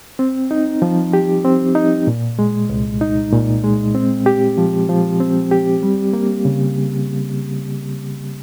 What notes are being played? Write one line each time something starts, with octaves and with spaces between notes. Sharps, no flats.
C4
D#4
F3
G4
C4
D#4
A#2
G#3
C2
D#4
A#2
G#3
C4
G4
F3
F3
C4
G4
G3
A#3
C#3